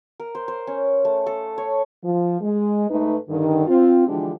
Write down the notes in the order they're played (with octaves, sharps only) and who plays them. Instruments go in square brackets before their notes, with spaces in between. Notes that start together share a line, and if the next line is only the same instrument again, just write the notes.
[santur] A#4
C5
C5
C#4
A3
A4
C#5
[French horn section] F3
G#3
G#2 A3 D#4 B4
G2 D3 D#3
C4 F4
D3 E3 F3 G#3 D4 G4